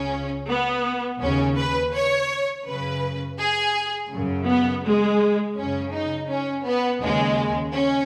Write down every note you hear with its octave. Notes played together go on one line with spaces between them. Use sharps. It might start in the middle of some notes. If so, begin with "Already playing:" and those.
Already playing: C#2 C#3 C#4
B3
D#2 C#3 C#4
B4
C#5
F#2 C#3 B4
G#4
F#2 C#3
B3
G#3
F#2 C#3 C#4
D#4
C#4
B3
D#2 C#3 G#3
C#4